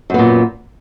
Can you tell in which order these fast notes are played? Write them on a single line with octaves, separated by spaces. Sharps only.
F#2 B3 A#2